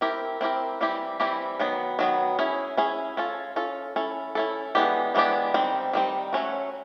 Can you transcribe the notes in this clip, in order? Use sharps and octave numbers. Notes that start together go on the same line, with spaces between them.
C4 E4 G4 A#4
C4 E4 G4 A#4
E3 G3 C4 E4 G4
E3 G3 C4 E4 G4
D#3 F#3 B3
D#3 F#3 B3
C#4 E4 G#4
C#4 E4 G#4
C#4 F4 A4
C#4 F4 A4
C#4 E4 A4
C#4 E4 A4
E3 G#3 B3 D4 G4
E3 G#3 B3 D4 G4
D#3 G3 C4
D#3 G3 C4
F#3 A3 C#4 F#4